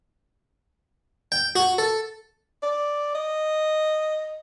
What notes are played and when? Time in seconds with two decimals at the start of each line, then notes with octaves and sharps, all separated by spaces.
1.32 G5
1.56 F#4
1.78 A4
2.63 D5
3.15 D#5